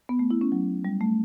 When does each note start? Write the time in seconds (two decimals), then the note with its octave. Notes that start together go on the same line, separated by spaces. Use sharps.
0.09 B3
0.19 A3
0.31 E4
0.41 C#4
0.52 F#3
0.85 G3
1.01 A3